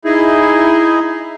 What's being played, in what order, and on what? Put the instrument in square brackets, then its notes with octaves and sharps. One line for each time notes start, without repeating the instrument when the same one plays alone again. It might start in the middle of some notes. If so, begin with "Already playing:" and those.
[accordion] D#4 E4 G#4